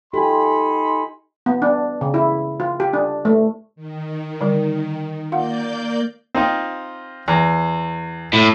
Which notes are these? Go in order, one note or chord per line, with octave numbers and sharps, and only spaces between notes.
D#4 F4 G4 A4 G#5 B5 C6
B3
D4
C#3
E4
F4
G4
D4
A3
D#3
D3 G3 A#4
A#3 F4 D5 F5 F#5 G6
C4 D#4 F4
E2 A#5
A2